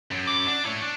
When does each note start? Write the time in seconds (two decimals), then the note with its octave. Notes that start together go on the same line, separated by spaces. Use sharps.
0.11 F#2
0.27 D6
0.47 D4
0.65 E4 C#5
0.82 D4